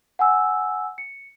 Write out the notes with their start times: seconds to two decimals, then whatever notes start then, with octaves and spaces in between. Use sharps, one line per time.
0.19 F#5 G#5 E6
0.98 C#7